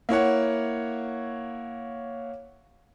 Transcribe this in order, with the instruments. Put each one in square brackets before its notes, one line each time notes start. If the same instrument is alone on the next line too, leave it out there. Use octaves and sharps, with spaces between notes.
[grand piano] A#3 E4 C#5 F#5